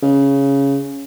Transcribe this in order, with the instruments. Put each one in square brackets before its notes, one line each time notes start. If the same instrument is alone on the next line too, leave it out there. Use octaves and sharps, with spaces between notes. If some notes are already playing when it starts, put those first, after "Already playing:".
[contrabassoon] C#3